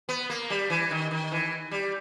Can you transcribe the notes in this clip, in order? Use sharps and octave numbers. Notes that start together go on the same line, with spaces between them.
B3
A#3
G3
E3
D#3
D#3
E3
G3